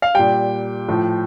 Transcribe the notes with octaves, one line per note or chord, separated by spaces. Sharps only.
F5
A#2 G3 G5
A2 F3